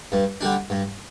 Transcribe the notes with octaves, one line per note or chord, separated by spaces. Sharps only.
G2
D3 G3 D4
G2